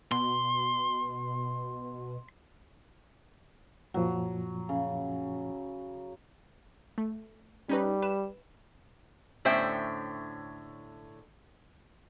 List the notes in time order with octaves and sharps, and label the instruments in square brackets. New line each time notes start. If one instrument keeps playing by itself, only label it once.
[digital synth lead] B2 [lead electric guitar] C6
[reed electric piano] F#2 A#2 F3 [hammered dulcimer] F#3
[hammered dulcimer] C#3
[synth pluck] A3
[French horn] G3 [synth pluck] C#4 D#4 B4
[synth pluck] B4 E7
[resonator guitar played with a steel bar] A2 D3 C#4 C5 E5 G5